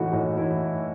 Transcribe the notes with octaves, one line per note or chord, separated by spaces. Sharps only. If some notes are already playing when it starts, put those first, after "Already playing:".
Already playing: A2 E3 A3 D#4 F#4
A2
E3 E4